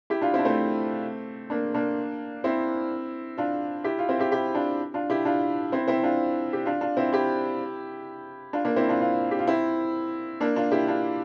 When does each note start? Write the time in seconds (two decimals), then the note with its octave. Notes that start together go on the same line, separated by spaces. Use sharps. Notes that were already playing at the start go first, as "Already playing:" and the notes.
0.10 E4 G4
0.21 D4 F4
0.34 C4 E4
0.39 D4
0.45 A3 C4
1.50 A#3 D4
1.74 A#3 D4
2.44 C4 E4
3.38 D4 F4
3.84 E4 G4
3.98 F4
4.09 C4 E4
4.19 E4 G4
4.32 E4 G4
4.55 D4 F4
4.94 D4 F4
5.10 E4 G4
5.25 D4 F4
5.72 C4 E4
5.88 C4 E4
6.03 D4 F4
6.53 G4
6.65 D4 F4
6.81 D4 F4
6.97 C4 E4
7.13 E4 G4
8.53 D4 F4
8.65 A#3 D4
8.76 C4 E4
8.89 D4 F4
9.01 D4 F4
9.31 G4
9.39 F4
9.47 C4 E4
10.41 A#3 D4
10.56 D4 F4
10.72 E4 G4
10.87 D4 F4